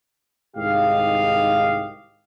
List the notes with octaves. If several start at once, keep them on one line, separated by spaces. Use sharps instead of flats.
C2 G#2 D#3 G4 D#5 F5